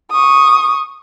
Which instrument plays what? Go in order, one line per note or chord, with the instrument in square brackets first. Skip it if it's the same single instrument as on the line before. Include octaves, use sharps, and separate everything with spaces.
[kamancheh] C#6 D#6